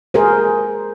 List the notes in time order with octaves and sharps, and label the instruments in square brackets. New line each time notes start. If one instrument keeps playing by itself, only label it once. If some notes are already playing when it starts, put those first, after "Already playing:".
[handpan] G#4 A#4 C5